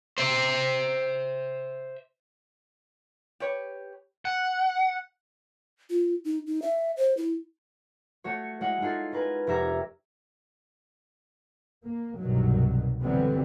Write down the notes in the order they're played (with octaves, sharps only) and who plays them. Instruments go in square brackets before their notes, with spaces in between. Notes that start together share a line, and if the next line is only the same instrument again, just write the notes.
[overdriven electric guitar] C5 E5
[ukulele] G4 B4 C#5
[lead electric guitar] F#5
[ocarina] F4
D#4
D#4
E5
C5
E4
[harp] A3 F#4 C#5
G#3 E4 F#4 C#5 F#5
G#3 D#4 F4 G#4 A4
C#4 A#4 B4 G#5
F1 G4 A#4 E5 A#5 G#6
[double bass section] A#3
C2 G2 B2 D#3 F#3
D3 E3 F#3 G3 B3 C4